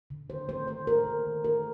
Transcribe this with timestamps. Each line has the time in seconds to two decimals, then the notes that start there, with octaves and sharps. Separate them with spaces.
0.10 D3
0.29 D#3 C5
0.49 A3 C5
0.68 D#3 C5
0.87 D#3 A#4
1.06 D#3
1.26 D#3
1.44 A3 A#4